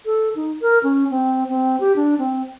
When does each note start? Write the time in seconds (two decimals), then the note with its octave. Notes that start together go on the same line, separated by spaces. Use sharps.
0.06 A4
0.36 D#4
0.62 A#4
0.83 C#4
1.10 C4
1.50 C4
1.80 G4
1.96 D4
2.19 C4